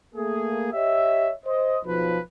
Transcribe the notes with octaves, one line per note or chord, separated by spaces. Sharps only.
A3 A#3 G#4
G4 C#5 D#5 E5
C5 D#5
B1 F3 B4